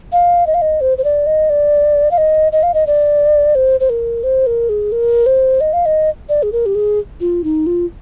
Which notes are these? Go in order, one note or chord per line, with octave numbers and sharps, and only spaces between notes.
F5
D#5
F5
D#5
C5
C5
D5
D#5
D5
F5
D#5
D#5
F5
D#5
D5
C5
C5
A#4
C5
A#4
G#4
A#4
C5
D#5
F5
D#5
D5
G#4
A#4
G4
G#4
F4
D#4
F4